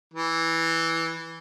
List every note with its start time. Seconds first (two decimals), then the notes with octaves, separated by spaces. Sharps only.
0.14 E3